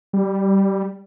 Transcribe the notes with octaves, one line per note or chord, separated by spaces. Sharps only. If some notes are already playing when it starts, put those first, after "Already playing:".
G3